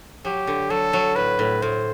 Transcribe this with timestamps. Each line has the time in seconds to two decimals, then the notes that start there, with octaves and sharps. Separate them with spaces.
0.25 F#3 G4
0.47 D3
0.70 F#3 A4
0.93 F#3
1.16 A2 B4
1.39 A2
1.62 A2 C5